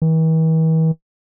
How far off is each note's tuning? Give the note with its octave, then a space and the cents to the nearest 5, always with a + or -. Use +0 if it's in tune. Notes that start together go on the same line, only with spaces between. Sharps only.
E3 -45